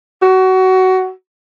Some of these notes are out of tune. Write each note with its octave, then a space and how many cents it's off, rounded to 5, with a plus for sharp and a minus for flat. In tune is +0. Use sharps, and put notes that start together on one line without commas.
F#4 +20